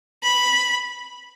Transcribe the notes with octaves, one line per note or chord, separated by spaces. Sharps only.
B5